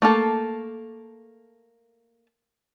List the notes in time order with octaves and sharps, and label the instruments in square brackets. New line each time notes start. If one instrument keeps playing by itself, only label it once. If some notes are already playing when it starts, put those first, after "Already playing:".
[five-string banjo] A3 A#3 A4